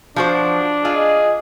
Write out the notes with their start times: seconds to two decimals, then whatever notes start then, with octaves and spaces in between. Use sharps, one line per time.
0.16 F3 D4 F#4 C5
0.85 F4 G#4 D#5